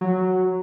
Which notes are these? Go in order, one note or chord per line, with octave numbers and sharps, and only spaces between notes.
F#3